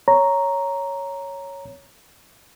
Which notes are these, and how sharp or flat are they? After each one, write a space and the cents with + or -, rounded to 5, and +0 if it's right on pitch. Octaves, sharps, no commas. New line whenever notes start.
C#5 +0 A#5 +0